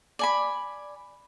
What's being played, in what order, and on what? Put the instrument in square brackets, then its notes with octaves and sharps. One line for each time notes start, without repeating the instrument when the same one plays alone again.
[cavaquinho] D5 G#5 B5